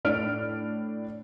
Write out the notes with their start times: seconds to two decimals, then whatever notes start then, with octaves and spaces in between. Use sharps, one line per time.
0.05 A2 D4 F6 D7